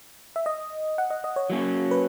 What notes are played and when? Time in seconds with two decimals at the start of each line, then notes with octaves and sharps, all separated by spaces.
0.36 E5
0.46 D#5
0.98 F#5
1.10 D#5
1.24 D#5
1.36 C#5
1.50 F#3 A#3 C#4
1.91 B4